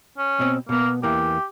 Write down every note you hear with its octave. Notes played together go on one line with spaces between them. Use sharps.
C#4
B2 C4
B2 A#3 B3
E2 E3 A#3 G4